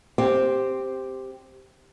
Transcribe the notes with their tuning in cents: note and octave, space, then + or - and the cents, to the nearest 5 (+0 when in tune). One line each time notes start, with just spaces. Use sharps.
C4 +0 G4 +0